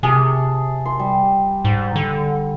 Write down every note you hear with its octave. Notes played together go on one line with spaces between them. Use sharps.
C3 G#4 A5
C6
G3
G#2
D3